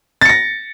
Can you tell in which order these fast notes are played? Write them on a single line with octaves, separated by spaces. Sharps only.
A6 C#7 A#6